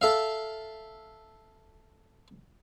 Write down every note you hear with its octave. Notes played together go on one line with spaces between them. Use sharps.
A4 E5 F5